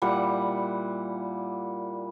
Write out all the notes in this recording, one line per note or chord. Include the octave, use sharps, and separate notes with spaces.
A#2 G3 E4 F#5